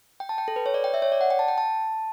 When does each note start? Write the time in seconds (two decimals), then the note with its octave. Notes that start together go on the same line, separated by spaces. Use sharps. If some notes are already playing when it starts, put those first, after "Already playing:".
0.20 G5
0.29 A5
0.38 G5
0.48 A4
0.56 B4
0.66 C#5
0.74 D5
0.84 G5
0.94 E5
1.02 C#5
1.12 D5
1.21 F#5
1.30 G5
1.39 A5
1.48 G5
1.58 A5